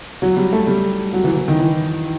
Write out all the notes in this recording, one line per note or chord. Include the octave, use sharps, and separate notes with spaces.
F#3
G3
A3
G3
F#3
E3
E3
D#3
E3